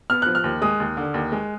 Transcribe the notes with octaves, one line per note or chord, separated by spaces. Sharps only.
B3 F6
F#6
F3
F6
D#2
G#3 D#6
D#2
D3
D#2
G#3